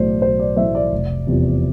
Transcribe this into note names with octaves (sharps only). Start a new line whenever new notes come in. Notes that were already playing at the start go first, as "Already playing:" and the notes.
Already playing: B1 A2 E3 A3 C5 D5
B1 C5
D5
A2 E3 A3 C5 E5
D5
F1
E2 C3 F3